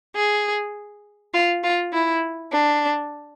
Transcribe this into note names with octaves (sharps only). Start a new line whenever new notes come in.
G#4
F4
F4
E4
D4